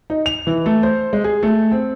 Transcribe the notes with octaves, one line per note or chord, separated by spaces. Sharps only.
D#4
F7
E3
A3
C5
G#3
G#4
A3
C4